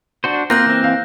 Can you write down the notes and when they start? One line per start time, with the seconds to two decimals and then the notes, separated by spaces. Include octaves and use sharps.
0.24 D4 F#4 C5
0.50 A#3 C4 F4 F#6 G6 A#6
0.66 E3 C4
0.84 F5